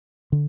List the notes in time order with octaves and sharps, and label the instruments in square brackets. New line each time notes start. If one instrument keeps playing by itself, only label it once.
[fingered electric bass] D3